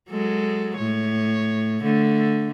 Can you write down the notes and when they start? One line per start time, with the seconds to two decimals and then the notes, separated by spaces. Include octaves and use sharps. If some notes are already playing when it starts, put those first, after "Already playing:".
0.10 F#3 G#3 A4
0.77 A2 C#5
1.82 D3 A3